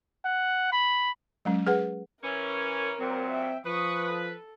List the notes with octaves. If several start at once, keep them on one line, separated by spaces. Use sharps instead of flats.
F#5
B5
F#3 G#3 C#4
G#4 B4 F#5
E3 C#4 A#4
A#2 F#3 C4
E5 G5
F3 B4 C#6 D#6
A4